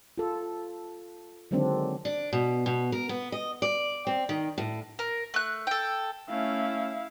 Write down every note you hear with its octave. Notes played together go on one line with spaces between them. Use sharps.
F4 A4
D3 D#3 F#3 G#3 C4 D4
D4
B2
B2
A#4
B3
D#5
D5
C4
D#3
A2
A#4
A3 F#6
A4 G5
A3 C#4 E4 F5